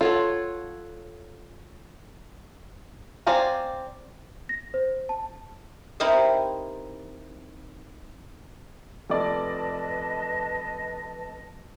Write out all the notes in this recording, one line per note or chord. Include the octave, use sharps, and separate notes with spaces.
F4 A4 C#5 F#5
C4 D5 F5 G#5 A#5
A#6
C5
A5
C4 D#4 E4 G4 A#4 D#5
F1 B4 D5 D#5 A5